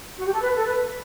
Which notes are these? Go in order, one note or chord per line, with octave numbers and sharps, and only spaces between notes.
F#4
G4
A4
B4
A4
B4